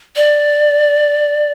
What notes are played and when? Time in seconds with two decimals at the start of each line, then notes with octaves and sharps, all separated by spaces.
0.16 D5